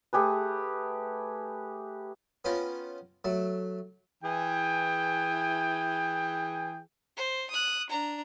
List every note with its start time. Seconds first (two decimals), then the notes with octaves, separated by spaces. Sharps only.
0.13 A3 G4 G#4 B4
2.45 B3 C#4 F4 G5 A#5
3.25 F#3 A3
4.24 E3 G#4 G5
7.16 C5
7.50 D#6 F#6
7.89 D4 A#5